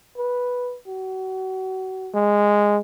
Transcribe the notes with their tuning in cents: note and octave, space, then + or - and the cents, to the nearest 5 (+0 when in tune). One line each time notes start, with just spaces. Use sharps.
B4 -5
F#4 +30
G#3 -10